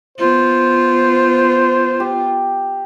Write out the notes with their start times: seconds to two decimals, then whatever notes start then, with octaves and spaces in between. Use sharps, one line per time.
0.18 B3 F4 C5
2.00 G4